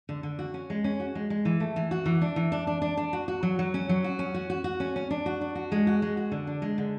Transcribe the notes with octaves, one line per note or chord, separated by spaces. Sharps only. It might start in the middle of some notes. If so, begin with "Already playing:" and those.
D3
D3
F#4
C#4
G#3
C#4
F#4
G#3
G#3
E3
A3
E3
F#4
E3
D4
E3
D4
D4
D4
D4
F#4
F#4
F#3
F#3
C#4
F#3
F#4
C#4
F#4
F#4
F#4
C#4
C#4
D4
F#4
D4
F#4
G#3
F#4
G#3
F#4
D3
D4
G#3
D3